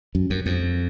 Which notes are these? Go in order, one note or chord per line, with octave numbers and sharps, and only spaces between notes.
F#2
F#2
F2